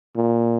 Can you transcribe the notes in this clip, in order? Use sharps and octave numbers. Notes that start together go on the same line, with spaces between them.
A#2